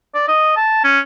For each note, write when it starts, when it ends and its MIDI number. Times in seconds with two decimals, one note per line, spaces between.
0.14 0.26 74
0.28 0.53 75
0.57 0.80 81
0.84 0.99 61